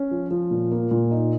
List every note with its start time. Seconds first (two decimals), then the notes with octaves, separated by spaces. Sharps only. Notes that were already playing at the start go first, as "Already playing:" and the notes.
Already playing: C#4
0.11 F3
0.31 F3
0.51 A#2
0.71 A#3
0.91 A#2
1.11 D#4